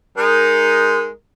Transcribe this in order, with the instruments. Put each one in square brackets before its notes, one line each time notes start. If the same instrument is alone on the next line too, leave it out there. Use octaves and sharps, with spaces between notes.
[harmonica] G#3 D#4 [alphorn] A#4